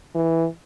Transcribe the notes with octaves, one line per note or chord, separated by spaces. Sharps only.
E3